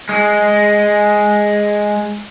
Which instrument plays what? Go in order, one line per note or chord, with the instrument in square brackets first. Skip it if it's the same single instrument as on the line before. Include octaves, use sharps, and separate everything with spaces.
[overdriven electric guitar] G#3